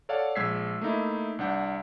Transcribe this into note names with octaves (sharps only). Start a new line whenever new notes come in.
A4 C#5 D5 F5 F#5 A5
A#1 G#3 E6 G#6 B6 C7
A3 A#3 D#4 E4
C2 D4 F#5 G6